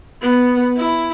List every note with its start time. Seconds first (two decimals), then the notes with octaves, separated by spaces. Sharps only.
0.22 B3
0.77 E4